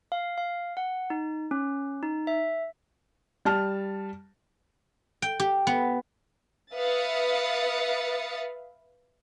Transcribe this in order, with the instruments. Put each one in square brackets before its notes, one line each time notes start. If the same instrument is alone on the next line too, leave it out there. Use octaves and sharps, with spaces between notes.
[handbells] F5
F5
F#5
D#4
C#4
D#4
E5
[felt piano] G3 A5 F6
[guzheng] G5
G4
B3
[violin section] B4 E5 F5 D#6 A6 C#7